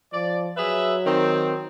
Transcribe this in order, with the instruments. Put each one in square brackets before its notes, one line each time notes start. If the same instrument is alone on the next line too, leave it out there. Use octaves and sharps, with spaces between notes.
[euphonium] F3 [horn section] D5
[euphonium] F#3 [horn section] G#4 B4 E5
[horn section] D#3 C4